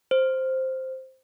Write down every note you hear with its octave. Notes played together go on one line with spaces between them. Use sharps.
C5